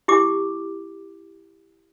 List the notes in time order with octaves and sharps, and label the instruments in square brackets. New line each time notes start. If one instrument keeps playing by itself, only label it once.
[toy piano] E4 G4 D6